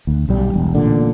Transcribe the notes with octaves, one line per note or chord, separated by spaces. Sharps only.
D2
B1 G3
E1
A1 A#2 D3